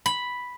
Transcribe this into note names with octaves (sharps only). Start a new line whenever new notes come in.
B5